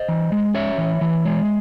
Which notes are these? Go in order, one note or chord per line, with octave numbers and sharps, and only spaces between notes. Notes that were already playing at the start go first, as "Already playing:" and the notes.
Already playing: C5 D#5
E3
G#3
C#4 C#5 E5
E3
E3
G#3